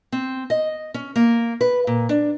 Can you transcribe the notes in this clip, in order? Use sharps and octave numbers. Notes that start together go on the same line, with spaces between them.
C4
D#5
C#4
A#3
B4
A#2
D4